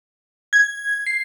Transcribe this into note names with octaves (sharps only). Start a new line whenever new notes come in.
G#6
C7